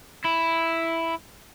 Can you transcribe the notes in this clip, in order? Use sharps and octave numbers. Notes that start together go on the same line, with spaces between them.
E4